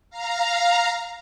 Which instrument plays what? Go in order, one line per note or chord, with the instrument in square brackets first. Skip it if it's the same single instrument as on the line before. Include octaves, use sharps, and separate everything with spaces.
[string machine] F5 A#5